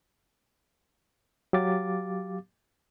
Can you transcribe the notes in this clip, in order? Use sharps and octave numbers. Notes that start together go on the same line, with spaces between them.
F#3 G4 F5 D6 A6